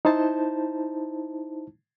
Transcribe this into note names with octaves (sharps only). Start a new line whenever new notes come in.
D#4 E4 C5 A5